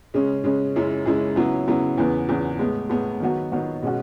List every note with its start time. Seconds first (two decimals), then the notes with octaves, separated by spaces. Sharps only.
0.14 C#3 G#3 C#4
0.44 C#3 G#3 C#4
0.76 F#2 C#3 G#3 C#4 E4
1.05 F#2 C#3 G#3 C#4 E4
1.36 C#3 F#3 B3 E4
1.68 C#3 F#3 B3 E4
1.98 E2 C#3 E3 B3
2.29 E2 C#3 E3 B3
2.59 A2 G#3 B3
2.89 A2 G#3 B3
3.20 D#3 F#3 B3 F#4
3.52 D#3 F#3 B3 F#4
3.82 B2 G#3 C#4 F#4